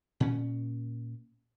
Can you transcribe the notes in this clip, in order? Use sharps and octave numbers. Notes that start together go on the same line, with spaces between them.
A#2 C#4